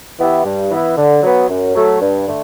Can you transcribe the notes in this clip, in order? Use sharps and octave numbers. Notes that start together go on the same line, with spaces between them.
E3 B3 E4 G4
G2
E3 B3 E4
D3
F#3 B3
F#2
F#3 A3
G2
D3 A3